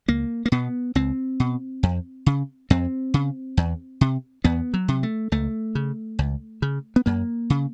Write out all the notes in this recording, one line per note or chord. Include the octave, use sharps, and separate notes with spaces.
C#2 A#3
A#3
B2 B3
C#2 C4
B2
F2
C#3
F2 C4
C#3
E2
C3
E2 B3
F#3
C3
A3
C#2 A3
C#3
C#2
C#3
B3
F#2 A#3
C#3